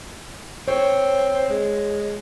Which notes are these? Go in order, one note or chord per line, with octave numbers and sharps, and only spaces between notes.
C4 C#5
G#3